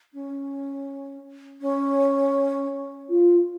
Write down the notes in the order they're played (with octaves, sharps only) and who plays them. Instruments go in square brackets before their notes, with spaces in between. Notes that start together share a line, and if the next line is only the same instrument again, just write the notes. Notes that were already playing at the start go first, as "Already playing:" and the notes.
[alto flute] C#4
C#4
F4